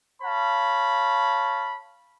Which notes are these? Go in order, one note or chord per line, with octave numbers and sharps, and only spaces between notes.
C#5 F5 A5 B5